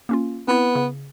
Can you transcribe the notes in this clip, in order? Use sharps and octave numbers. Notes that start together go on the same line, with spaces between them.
A#3 C#4 F4
B3 C4 E4
C#3